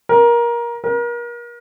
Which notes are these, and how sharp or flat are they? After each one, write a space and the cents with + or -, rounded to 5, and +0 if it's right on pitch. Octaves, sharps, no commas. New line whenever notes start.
A#4 +20
A#4 +35